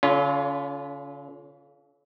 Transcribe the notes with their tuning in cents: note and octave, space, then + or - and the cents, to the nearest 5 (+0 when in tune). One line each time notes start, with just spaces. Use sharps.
D3 -40 C#4 +25 F4 +0